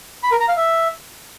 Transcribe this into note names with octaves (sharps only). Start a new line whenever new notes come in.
B5
A#4
A#5
F5
E5